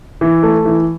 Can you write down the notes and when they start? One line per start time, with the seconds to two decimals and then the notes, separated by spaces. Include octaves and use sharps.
0.21 E3
0.43 A3
0.65 E3